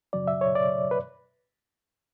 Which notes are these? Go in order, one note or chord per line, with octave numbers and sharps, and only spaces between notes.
F#2 C#3 F#3 D5
E5
C#5
D5
B4